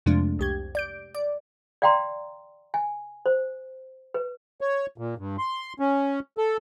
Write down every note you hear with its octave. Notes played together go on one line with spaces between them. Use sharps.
F2 C3 F3 G#3 A3 D4
C2 G4 G#6
D5 G6 D7
D5
D5 F5 G5 A#5 C6
G#5
C5
B4
C#5
A#2
G2
C6
C#4
A4